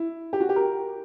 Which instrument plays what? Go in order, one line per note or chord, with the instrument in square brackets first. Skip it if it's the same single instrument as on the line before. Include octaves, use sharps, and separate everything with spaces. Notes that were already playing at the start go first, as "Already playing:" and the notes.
Already playing: [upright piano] E4
G4
F#4
G4
A#4